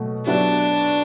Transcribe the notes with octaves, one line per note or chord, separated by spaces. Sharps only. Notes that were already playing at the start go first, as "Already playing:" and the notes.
Already playing: B2 F#3 A3
F#3 B3 D4 E4 G4 B4